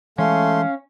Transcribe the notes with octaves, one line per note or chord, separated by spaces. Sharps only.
E3 G#3 A3 C#4 F5 C6